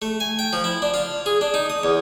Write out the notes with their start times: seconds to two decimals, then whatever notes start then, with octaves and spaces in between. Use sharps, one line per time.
0.02 A3
0.20 G#5
0.39 G5
0.53 F3
0.64 E4
0.82 D4
0.94 F4
1.26 G#4
1.41 D4
1.54 D#4
1.70 D#6
1.83 E2